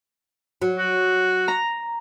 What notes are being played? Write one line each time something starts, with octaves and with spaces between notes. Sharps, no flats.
F#3
F#4
A#5